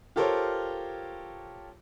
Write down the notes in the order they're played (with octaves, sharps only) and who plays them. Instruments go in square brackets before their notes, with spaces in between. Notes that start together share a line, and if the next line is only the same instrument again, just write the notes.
[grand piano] F4 G4 A4 A#4 C5 C#5